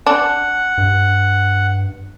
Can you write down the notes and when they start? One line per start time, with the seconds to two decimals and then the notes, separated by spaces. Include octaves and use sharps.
0.06 D4 F#5
0.78 G2